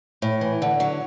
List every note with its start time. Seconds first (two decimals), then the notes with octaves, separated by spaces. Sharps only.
0.22 A2
0.41 E3
0.62 D3
0.80 F#3